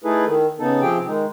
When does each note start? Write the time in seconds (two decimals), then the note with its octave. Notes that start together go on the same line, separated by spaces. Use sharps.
0.04 A3 D#4 E4 G#4 A4 B4
0.26 D#3
0.59 C#3 B3 D#4 A4
0.81 C3 F3 C4 G4 G#4 G5
1.07 D#3 G#3 D#4